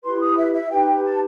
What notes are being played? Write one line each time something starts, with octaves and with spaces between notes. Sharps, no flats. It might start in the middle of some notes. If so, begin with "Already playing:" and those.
E4 G4 B4 C6
D#6
E5
E5
D#4 G4 B4 G5
A5